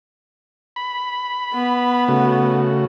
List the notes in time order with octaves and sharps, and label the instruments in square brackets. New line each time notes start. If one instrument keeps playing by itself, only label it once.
[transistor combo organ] B5
[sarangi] B3
[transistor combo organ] C#3 A3 F#4